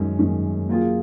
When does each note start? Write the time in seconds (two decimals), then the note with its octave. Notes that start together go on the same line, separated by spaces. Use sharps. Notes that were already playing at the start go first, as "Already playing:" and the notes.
Already playing: F#2 D#3 G#3 C#4
0.19 F#2 D#3 G#3 C#4
0.69 F#3 A#3 F4 G#4